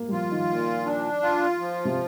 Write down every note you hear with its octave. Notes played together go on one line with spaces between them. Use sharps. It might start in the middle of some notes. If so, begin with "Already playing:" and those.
Already playing: A#3
G3
F3 F4
D#3
A#2
D4
F4
F3
C3